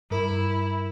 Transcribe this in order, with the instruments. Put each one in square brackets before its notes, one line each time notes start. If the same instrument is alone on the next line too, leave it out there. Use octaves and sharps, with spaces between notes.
[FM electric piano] G2 A#4 [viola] E4